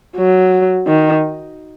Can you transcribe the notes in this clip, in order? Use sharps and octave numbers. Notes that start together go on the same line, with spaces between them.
F#3
D#3